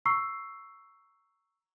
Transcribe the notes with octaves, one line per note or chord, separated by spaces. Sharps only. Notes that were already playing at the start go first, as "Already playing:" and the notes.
A#5 C#6 E6 C7